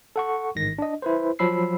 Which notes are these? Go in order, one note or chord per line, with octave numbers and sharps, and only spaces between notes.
A4 F#5 C#6
A1 G#2 D#3 A#6
D4 D#5
E4 B4 C5
F3 F#3 B5 E6 C7